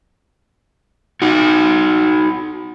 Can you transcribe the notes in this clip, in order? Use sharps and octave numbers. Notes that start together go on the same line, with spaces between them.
D#4 F#4